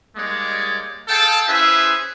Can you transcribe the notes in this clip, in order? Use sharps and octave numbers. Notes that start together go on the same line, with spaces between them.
G3 G#3 A#3 D#4 C#5 D5
G#4 A4 F5 G5 A5
C#4 E4 G#4 B4 C5 E5